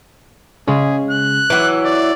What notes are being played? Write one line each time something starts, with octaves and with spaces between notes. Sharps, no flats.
C#3 G#3 C#4 G#4
F#6
E3 F#3 D6
D5